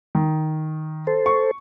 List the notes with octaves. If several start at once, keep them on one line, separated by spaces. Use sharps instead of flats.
D#3
A4 C5
C#6